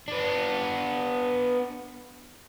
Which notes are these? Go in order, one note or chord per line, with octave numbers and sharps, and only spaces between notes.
B3 D4